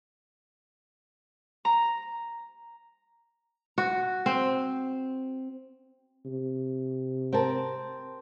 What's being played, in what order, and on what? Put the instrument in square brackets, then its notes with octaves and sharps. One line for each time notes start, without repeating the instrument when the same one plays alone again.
[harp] A#5
[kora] F#4
C4
[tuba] C3
[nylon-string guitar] C4 A#4 A5